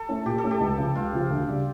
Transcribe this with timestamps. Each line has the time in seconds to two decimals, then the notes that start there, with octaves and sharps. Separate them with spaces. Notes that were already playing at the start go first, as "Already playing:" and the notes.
Already playing: A4
0.09 A3 C#4 E4
0.25 A#2 G4
0.38 A4
0.43 A3 C#4 E4
0.51 G4
0.60 C#2
0.78 C#3 F3
0.95 C#2 F4
1.13 C#3 F3
1.30 D2
1.48 C#3 G3 D4